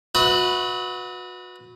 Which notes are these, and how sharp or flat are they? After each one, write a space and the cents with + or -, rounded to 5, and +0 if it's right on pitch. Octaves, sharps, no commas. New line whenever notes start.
F#4 -30 B4 +0 E5 -45